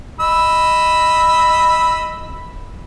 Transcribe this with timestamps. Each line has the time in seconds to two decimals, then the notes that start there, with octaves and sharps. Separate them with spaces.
0.20 D#5 B5 E6